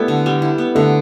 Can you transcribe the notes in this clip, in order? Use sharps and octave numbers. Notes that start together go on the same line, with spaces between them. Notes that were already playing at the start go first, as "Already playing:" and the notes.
Already playing: G3 A3 B3 E4
D3
G3
E4
B3
D3 A3